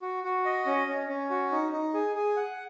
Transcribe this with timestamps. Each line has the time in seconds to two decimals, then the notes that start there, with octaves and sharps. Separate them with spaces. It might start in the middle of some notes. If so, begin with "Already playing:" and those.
0.02 F#4
0.24 F#4
0.45 D#5
0.66 C#4
0.88 C#4
1.09 C#4
1.30 F#4
1.52 D#4
1.72 D#4
1.94 G#4
2.15 G#4
2.37 F#5